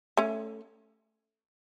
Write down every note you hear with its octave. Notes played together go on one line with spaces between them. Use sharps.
A3 C#4